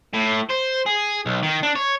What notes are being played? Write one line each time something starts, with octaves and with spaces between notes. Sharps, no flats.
A2
C5
G#4
B1
D#3
D4
C#5